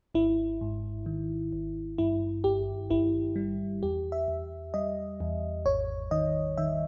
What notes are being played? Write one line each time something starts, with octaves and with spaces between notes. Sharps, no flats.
G#1 E4
G#2
D#3
G#1
G2 E4
G1 G4
G1 E4
G3
E2 G4
E5
E2
G3 D#5
E2
G#1 C#5
D#3 D#5
D#3 E5